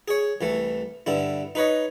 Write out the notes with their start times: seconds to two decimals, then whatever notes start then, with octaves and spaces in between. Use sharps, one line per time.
0.08 G#4 C#5
0.41 C2 E3 A3
1.06 G2 D3 E4
1.55 D#4 B4 C#5 D#5